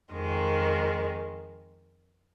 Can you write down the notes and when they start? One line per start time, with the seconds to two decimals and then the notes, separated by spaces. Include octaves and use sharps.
0.12 F2 D#3 G#3